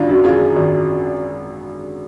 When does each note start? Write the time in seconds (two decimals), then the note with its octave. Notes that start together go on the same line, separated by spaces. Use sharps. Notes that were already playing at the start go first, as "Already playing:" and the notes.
Already playing: G#1 F#3 D4 F4
0.09 F#2
0.24 F4 G#4
0.56 G#1